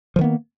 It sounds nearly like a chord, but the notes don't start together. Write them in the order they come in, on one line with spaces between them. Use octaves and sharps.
F3 D#3 B3 A#3